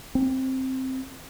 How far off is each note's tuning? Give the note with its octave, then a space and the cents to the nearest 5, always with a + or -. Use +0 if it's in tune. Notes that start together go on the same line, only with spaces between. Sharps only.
C4 +5